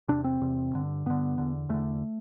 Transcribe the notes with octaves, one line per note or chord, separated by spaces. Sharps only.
E2 C3 D4
C4
E2 C3
G2 D3
G2 D3 B3
E2 D3
E2 D3 A3